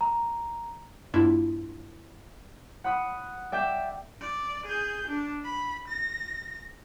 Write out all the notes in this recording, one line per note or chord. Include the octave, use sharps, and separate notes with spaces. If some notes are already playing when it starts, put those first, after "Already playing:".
A#5
G2 A#3 D4 E4 F4
F#5 B5 D#6
D5 E5 G5
D5
G#4 G6
D4
B5
A#6